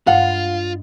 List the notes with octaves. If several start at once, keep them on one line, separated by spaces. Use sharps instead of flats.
G2 G#3 F4 D#5 F5 F#5